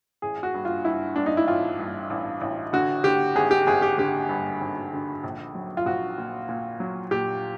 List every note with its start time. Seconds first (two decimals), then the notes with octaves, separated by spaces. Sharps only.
0.22 A1 G#4
0.43 F#4
0.54 G2
0.65 F4
0.85 G2 E4
1.16 G2 D4
1.26 D#4
1.37 E4
1.48 A1 F4
1.79 G2
2.10 A1
2.41 A1
2.73 D3 F#4
3.04 D3 G4
3.36 G#1 G#4
3.51 G4
3.67 G#1 G#4
3.82 G4
3.98 D3 G4
4.29 G2
4.61 G#1
4.93 D3
5.24 A#1
5.55 F#3
5.77 F4
5.86 A#1 F#4
6.18 A#2
6.49 A#2
6.80 F#3
7.11 A#2 G4